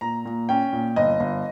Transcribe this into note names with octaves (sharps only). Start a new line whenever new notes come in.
A#2 A#5
A#2
C#4 G5
A#2
G1 D#5
G1